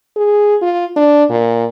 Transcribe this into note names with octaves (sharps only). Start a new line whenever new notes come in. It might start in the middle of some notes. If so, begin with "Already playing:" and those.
G#4
F4
D4
A#2